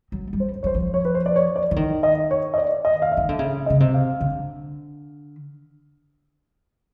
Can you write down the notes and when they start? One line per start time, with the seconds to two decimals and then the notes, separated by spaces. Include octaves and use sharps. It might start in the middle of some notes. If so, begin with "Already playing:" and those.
0.12 F#3
0.33 G3
0.40 C5
0.63 F#3 C5 C#5
0.75 F3
0.94 C#5
1.05 B4
1.15 C5
1.26 D5
1.36 C#5
1.56 D5
1.71 E3
1.76 D#3
2.03 D#5
2.31 C#5
2.54 D#5
2.58 D5
2.85 D#5
3.02 F5
3.12 E5
3.17 D#3
3.29 D3
3.39 C#3 E5
3.66 D#5
3.70 C#3
3.80 C3
3.94 F5
4.20 D3